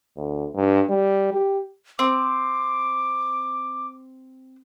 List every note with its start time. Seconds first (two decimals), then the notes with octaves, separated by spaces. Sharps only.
0.17 D2
0.56 G2
0.90 G3
1.34 G4
1.99 C4 D6